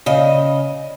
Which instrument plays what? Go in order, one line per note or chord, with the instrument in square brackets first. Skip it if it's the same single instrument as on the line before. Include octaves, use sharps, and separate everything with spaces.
[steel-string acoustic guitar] C#3 D#5